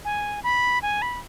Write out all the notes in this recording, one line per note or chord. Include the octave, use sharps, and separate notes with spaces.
G#5
B5
G#5
B5